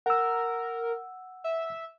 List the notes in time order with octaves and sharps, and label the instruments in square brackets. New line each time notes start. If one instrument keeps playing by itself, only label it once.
[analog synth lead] A#4 [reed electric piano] F#5 E6
[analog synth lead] E5